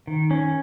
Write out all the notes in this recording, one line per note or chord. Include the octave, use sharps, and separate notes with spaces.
D#3
C#4